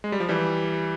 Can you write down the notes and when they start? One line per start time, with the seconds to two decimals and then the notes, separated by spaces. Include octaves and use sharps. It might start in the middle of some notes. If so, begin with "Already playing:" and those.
0.04 G#3
0.12 G3
0.20 F3
0.29 E3 G3